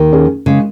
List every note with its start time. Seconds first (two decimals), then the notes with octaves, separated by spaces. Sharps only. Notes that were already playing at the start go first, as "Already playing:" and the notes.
Already playing: D#2 D#3
0.13 C#4 G#4
0.46 C#3 G#3